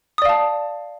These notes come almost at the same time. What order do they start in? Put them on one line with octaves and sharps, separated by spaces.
D#6 D5 F5 A5